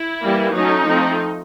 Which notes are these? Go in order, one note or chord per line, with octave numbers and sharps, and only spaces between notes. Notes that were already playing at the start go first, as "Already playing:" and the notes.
Already playing: E4
E3 G3 A#3
F#3 A3 C#4 D#4
F3 A3 C4